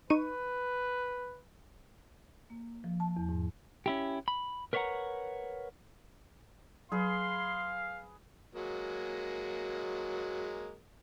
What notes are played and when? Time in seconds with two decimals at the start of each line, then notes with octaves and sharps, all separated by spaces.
0.10 D#4 B4 C#6 D#7
2.50 A#3
2.84 F3
3.00 A5
3.17 E2
3.29 G#2
3.86 C#4 E4 G4
4.28 B5
4.73 A#4 B4 C#5 E5 F#5 A#5
6.92 F#3 G#4 B4 F5 C6
8.55 F#3 G#3 A#3